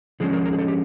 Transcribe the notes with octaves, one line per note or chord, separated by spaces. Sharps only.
D3 F3 G#3 C#4 G#4
A#4
A#4
G#4
A4
G4